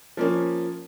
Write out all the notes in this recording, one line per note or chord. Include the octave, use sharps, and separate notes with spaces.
F3 A#3 C#4